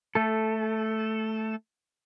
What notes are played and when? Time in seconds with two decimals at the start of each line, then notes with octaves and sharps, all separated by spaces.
0.15 A3 A4